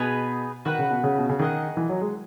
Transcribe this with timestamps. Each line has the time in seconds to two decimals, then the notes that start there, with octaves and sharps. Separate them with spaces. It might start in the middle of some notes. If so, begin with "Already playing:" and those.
Already playing: B2 B3 D#4 G#4 B4
0.65 D#3 F#4 B4 F#5
0.79 C#3
0.91 B2
1.03 C#3
1.18 B2
1.29 C#3
1.39 D#3 G#4 D#5 F#5
1.77 E3
1.89 F#3
2.01 G#3